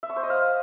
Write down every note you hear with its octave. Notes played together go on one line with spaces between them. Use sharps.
E5
C#6
C5
D#5
F5